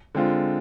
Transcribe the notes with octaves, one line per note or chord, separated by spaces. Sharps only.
D3 G#3 C4 F4